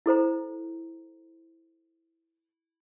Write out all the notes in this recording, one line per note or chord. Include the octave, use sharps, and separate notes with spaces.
E4 A4 C5 A#5